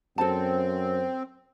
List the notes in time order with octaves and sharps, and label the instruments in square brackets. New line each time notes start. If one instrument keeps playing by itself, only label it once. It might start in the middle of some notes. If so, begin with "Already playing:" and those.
[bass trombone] F#2 [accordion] C4 [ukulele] A4 A5